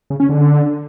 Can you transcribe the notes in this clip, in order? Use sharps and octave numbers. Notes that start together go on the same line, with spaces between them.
C#3
C#4
D3